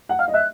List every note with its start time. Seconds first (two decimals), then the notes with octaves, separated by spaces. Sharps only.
0.09 F#5
0.19 F5 F6
0.28 D#5
0.34 E5 F#6